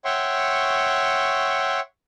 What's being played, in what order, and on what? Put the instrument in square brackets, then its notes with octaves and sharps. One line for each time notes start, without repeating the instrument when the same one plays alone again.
[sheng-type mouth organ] C#5 E5 F#5 G5 C6 C#6